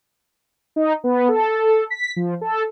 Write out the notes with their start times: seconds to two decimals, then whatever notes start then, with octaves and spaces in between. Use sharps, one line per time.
0.76 D#4
1.04 B3
1.28 A4
1.90 B6
2.16 F3
2.41 A4